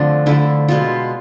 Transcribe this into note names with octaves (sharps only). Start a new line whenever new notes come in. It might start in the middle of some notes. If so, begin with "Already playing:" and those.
Already playing: D3 F3 A3 C4 D4
D3 F3 A3 E4
B2 G#3 B3 F4